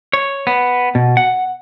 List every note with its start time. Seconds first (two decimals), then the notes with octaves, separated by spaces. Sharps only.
0.13 C#5
0.47 B3
0.95 B2
1.17 F#5